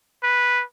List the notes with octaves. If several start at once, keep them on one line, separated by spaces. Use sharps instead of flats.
B4